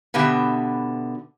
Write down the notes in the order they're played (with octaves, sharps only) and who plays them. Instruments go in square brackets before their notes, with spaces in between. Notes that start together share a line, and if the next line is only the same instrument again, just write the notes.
[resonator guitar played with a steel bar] B2 D3 B3 G4 E5